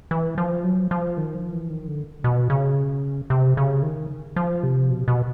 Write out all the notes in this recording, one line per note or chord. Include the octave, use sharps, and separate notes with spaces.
E3
F3
F#3
F3
D#3
F3
E3
D#3
D3
B2
C#3
C3
C#3
D#3
F3
C3
B2
B2